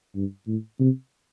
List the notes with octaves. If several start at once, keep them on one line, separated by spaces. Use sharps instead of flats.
G2
A2
C3